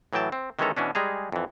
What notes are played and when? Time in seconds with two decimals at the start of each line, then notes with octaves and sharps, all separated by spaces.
0.13 A2 E3 F#3 G5 A5
0.32 C4
0.59 D#3 E3 G#3 C#4 A4 A#5
0.77 B2 E3 C#4 D4
0.95 G3 G#3 G#4 A#5
1.32 F2 E3